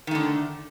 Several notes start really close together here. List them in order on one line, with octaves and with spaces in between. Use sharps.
D#3 A3 D3